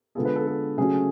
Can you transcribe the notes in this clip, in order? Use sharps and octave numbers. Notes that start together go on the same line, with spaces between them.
D3 G#3 B3 F4 G#4 A4
B4
A4
A4
C#3 F#3 A3 C#4 F#4 G#4